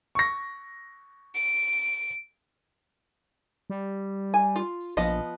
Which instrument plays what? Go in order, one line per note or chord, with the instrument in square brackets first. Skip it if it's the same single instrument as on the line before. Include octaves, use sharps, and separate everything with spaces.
[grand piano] C#6 A#6
[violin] D7
[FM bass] G3
[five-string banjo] G#5
F4
[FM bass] A#1 [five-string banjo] F3 B3 D#5